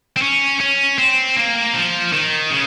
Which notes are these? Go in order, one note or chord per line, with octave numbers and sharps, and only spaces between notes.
C4
C#4
C#4
C4
A#3
F3
D#3
C#3